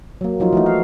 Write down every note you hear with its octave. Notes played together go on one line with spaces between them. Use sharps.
F#3 A#3
F3 F#3 D#4 F4
E3 A3 D#4
F5